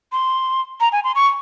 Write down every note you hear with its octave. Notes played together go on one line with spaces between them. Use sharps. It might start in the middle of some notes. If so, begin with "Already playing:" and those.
C6
A#5
G#5
C6
C#6